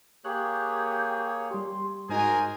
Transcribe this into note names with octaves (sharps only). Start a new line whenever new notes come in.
A#3 G4 G#4 C#5 F#6
G3 G4 C6
G#2 D#4 F#4 G#4 A#4 C5 G#5